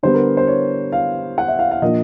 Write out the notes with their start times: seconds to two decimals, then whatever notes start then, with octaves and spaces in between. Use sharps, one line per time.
0.03 D3 G3 B3 C5
0.14 A#4
0.37 C5
0.47 C#5
0.92 F5
1.38 F#5
1.48 E5
1.59 F5
1.71 F5
1.82 A#2 F3 A#3 D4 F4 D#5